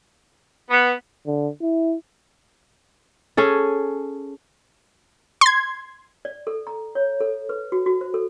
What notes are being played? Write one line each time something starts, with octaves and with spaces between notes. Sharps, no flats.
B3
D3
E4
C#4 G#4 A4
C6 G#6
D5
A4
A#5
C#5
A4
B4
F#4
F#4
C5
A4